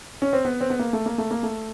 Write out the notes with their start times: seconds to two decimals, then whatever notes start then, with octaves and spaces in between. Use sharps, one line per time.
0.22 C#4
0.33 C4
0.45 B3
0.61 C4
0.70 B3
0.79 A#3
0.93 A3
1.06 A#3
1.18 A3
1.31 A#3
1.43 A3